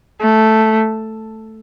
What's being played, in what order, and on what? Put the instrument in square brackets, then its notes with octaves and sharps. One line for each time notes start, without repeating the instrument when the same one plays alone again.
[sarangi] A3